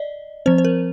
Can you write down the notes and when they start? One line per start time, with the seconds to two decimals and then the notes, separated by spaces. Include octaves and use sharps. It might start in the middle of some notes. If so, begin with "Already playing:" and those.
Already playing: D5 D#5
0.46 F3 C4 C5
0.58 C5
0.65 A#4